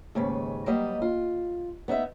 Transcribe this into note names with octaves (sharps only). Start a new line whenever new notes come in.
D#2 G#2 C#3 B4
F#3 G3 A#3 B4 D#5
F4
B3 D#4 E4 E5